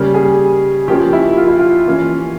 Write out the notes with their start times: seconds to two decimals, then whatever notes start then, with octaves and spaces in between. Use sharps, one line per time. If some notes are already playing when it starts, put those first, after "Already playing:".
Already playing: C#3 G3 A#3 C#4
0.14 G#4
0.88 F3 A#3 C#4 G4
1.13 E4
1.37 F4
1.48 E4
1.59 F4
1.87 E3 A#3 C#4